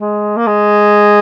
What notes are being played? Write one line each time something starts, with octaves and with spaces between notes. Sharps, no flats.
G#3
A#3
G#3